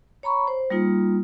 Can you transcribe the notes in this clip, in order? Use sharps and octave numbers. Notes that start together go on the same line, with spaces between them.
C#5 A#5 B5 C#6
C5
G3 A#3 D#4 F4